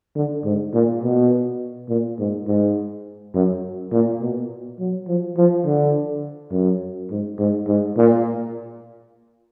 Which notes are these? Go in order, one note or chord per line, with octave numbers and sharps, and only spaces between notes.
D3
G#2
A#2
B2
A#2
G#2
G#2
F#2
A#2
B2
F#3
F3
F3
D3
F#2
G#2
G#2
G#2
A#2